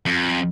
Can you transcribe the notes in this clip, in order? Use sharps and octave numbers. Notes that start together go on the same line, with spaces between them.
F2